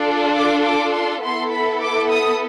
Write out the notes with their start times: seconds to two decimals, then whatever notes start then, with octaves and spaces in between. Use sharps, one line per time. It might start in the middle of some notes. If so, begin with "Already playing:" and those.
Already playing: D4 F4 A4
0.36 D6
0.65 D6
0.94 C6
1.23 B3 E4 A4 C6
1.52 B5
1.81 D6
2.10 D#6